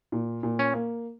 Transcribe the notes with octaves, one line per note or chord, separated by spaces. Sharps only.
A#2
A#2
C#4
A#3